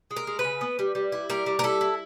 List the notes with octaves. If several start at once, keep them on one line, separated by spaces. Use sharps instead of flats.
G#3
A#4
G#3
B4
C#3
B3
G3
G3
E4
G3 A#4
G3
A#4
E4 A4
E4